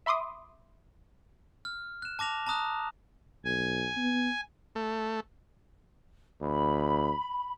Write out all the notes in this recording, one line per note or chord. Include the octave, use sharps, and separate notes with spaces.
E5 B5 C6 D6 D#6
F6
F#6 E7
A5 D6 A#6 F7
A5 A#5 D#6 F#6
B1 G#5
B3
A3
D2 B5